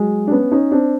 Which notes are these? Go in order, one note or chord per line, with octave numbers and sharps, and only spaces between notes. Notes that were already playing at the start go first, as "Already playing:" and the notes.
Already playing: F#3 G#3
D4
B3 C#4
C#4 D#4
C4 D4